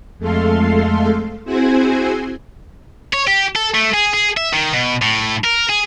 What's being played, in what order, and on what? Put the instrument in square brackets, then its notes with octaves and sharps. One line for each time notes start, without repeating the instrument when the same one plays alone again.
[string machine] F2 G#3 A3 A4 F5 C6
C4 E4 F#4 G#4 C5 G#5
[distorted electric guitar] C#5
G4
A4
A3
G#4
G#4
E5
D#3
B2
A2
A#4
G#4